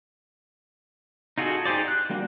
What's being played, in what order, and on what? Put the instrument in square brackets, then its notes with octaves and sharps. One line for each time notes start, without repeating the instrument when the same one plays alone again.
[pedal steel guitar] D#4 F4 F#4 G#4 A4
D#4 G4 G#4 C5 D5
F#6
G3 A#3 D4 F#4